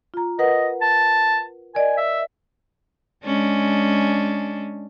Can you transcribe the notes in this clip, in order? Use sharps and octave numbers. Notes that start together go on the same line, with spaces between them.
F4 A#5
A#4 B4 D#5 F#5
A5
A#4 D5 D#5 G#5
E5
G#3 C#4 D4